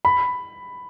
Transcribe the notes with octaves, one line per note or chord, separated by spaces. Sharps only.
B5